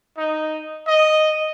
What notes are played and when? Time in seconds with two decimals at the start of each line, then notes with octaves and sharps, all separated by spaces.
0.18 D#4
0.87 D#5